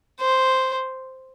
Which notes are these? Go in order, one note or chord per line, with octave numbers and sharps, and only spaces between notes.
C5